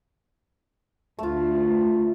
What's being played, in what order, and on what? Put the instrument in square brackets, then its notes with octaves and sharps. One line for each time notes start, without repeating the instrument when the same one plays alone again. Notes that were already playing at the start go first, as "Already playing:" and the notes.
[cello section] D2 [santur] A3 F4